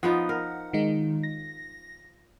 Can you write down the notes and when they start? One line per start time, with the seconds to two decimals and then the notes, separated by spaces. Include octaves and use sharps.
0.03 F3 B3 D#4 F#5
0.29 A#4
0.73 D#3 G#3 D#4
1.23 A#6